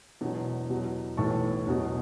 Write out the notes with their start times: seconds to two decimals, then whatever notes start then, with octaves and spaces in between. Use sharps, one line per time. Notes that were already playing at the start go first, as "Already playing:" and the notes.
0.21 E1 E2 B2 F#3
0.70 E2 B2 F#3
1.17 B1 A2 E3 A5 C#6
1.66 E1 E2 B2 F#3